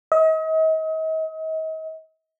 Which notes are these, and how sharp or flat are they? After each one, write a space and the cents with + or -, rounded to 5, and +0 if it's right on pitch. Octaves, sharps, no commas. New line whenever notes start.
D#5 +40